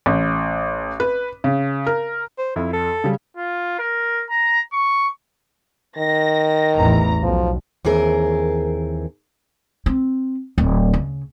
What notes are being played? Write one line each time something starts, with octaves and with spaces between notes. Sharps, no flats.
A1
B4
C#3
A#4
C5
F2 E4
A4
C#3 G3
F4
A#4
A#5
C#6
D#3 A#6
A1 E2 A#5
B1 F3
D#2 E3 C4 G#4 A#4
C4
D1
C#3